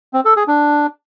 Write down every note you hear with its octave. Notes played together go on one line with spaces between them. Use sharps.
C4
A4
G#4
D4